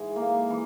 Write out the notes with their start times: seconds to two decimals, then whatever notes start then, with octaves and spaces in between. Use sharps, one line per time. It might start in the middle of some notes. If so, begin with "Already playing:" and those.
Already playing: G#2 E3 G#3
0.16 A#3
0.50 E3